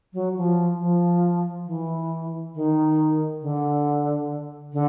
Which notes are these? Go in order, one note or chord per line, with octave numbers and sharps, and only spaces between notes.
F#3
F3
F3
E3
D#3
D3
D3